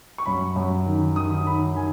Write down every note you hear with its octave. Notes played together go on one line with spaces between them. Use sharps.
C#6
F#2 B5
F#2
D#3
D#3 D#6
D#3 B5
D#3 G#5